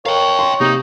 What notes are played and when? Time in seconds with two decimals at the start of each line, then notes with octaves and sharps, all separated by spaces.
0.06 A#4 C#5 F5 G5
0.39 C6
0.61 C3 A#3 D#4